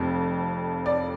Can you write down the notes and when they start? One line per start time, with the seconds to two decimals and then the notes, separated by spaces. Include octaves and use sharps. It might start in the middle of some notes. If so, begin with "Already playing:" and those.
Already playing: F1 F2
0.86 D5